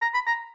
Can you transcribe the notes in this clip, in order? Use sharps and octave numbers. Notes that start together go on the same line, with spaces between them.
A#5
B5
A#5